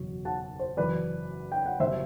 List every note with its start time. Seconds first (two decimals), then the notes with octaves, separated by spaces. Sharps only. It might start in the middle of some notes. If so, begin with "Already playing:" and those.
Already playing: F#1 E2 B2 F#3
0.25 F#5 A5
0.60 C5
0.77 F#1 F#2 E3 B4 D5
1.52 G5
1.65 F#5
1.80 F#1 B2 G3 C5 E5